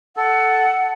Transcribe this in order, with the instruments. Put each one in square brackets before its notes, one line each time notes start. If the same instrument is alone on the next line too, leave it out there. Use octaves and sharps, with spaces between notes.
[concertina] A4 [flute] F#5